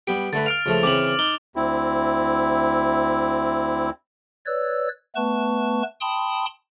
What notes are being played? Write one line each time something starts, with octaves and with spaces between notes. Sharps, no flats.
G3 B3 G4 D7
D3 A3 B4 A6
F5 F6 D7 F7
C#2 F3 A3
C#3 E3 C4 D6 F#7
D#4 G7
D2 C4 E4
B4 C#5 D5 E6
A3 B3 B4 A5 C#6
G5 A5 B5 C6 D#6